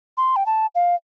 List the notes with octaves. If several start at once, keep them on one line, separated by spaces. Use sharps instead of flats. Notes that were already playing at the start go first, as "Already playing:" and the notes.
C6
G5
A5
F5